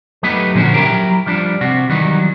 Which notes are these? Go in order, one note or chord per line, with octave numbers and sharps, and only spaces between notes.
F#3 A3 B3 D#4 G4 B4
A#2 D3 F3 C#4 F#4
F#3 E4 F4 G4 A#4
F3 G3 D4
C3 F#4
D#3 E3 F#3 G3